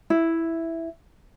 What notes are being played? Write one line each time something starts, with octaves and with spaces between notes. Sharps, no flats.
E4